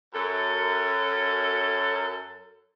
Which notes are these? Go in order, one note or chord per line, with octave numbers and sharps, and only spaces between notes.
F#2 A4